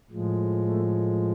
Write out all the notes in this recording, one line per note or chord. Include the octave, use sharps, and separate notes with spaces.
A2 F3 G#3
A3